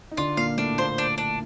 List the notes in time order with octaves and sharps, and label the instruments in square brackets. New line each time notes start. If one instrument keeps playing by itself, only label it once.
[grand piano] D#4
[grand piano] D3 D4 [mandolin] F4
[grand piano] A#2 A#3 [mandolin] F5
[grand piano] A2 A3 [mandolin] D4
[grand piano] A#2 A#3 [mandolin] C5
[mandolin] D4
D4